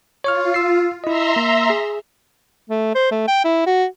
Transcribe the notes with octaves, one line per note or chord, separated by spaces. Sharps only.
F4 C#5 C#6 F6
E6 C7
E4 D#5 E5 A#5 C6
A#3
G#4
A3
C5
A3
G5
E4
F#4